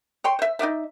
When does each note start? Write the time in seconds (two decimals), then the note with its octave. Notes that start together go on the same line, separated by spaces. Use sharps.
0.24 C#5 G5 C6
0.39 C5 E5
0.59 D#4 F#4 D5 E5